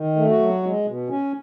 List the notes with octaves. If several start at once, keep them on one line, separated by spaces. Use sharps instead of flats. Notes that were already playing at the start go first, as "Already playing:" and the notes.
Already playing: D#3
A3
F#4
F#3
G#3
B2
C#4